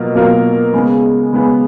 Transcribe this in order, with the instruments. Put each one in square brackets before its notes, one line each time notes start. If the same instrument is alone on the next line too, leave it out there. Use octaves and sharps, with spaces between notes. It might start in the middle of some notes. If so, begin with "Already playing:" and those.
Already playing: [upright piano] B2 F#3 A#3 F4 A#4
B2 F#3 A#3 F4 A#4
C#3 G#3 B3
C#3 G#3 B3